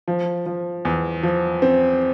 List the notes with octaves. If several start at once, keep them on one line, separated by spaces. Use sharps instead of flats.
F3
F3
E2
F3
C4